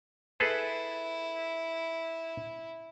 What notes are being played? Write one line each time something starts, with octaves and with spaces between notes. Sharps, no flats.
E4 G#4 A4 B4